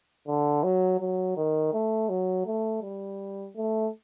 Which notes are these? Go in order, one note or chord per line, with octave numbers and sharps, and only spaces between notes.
D3
F#3
F#3
D#3
A3
F#3
A3
G3
A3